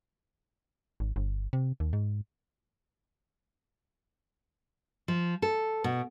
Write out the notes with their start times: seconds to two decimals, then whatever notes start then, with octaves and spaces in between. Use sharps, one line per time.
1.00 G#1
1.16 G1
1.53 C3
1.80 D#2
1.93 G#2
5.08 F3
5.42 A4
5.84 B2